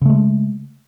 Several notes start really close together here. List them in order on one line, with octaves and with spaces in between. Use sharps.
C#3 A3 G#3